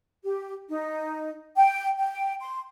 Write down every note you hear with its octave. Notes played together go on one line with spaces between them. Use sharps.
G4
D#4
G5
G5
C6